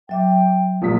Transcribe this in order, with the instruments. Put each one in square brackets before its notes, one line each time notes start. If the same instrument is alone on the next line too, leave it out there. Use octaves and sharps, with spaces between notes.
[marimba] F#3 E5 D6 [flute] G5
[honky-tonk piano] A#1 A#2 B6 [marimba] A#3 D#6